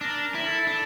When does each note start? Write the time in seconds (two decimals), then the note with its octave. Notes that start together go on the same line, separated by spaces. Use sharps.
0.01 D4 A#4
0.24 A#4
0.35 E4
0.46 A4
0.67 D4 A4